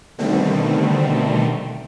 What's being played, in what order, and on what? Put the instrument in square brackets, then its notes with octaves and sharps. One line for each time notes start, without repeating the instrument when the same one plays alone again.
[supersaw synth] B2 D3 D#3 G3 A3 C4